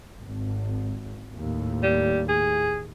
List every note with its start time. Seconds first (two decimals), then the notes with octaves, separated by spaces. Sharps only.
0.21 G#1
1.35 D#2 A2
1.83 G3
2.29 G#4